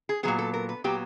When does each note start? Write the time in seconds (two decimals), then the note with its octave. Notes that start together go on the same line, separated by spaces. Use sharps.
0.09 G#4
0.23 A#2 F#3 B3 G#4
0.39 A4
0.54 A#4
0.69 B4
0.84 A#2 F#3 B3 G4